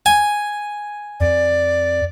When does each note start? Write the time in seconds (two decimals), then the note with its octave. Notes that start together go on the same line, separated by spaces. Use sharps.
0.06 G#5
1.20 F2 D5